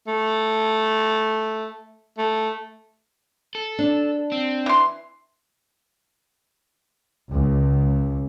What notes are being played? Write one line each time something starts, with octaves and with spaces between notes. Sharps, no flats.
A3
A3
A4
D4
C4
E3 C6
C#2